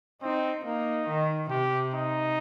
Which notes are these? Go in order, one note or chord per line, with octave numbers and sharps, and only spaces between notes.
C4 D#4
A#3 D#4
D#3
C3 G4
D#4